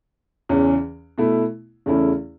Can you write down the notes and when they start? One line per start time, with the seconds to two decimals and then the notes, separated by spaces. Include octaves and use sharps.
0.49 E2 C#3 E3 C#4
1.18 B2 A3 E4
1.86 E2 C#3 A3 C#4 E4